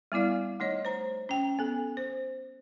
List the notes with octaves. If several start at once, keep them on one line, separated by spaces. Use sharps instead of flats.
G3 B3 E4 D5 F5
A3 D#4 C#5 D#5
C5 A#5
C#4 G5
B3 A4
C5